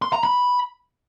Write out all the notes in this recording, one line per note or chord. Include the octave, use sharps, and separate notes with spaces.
C6
A#5
B5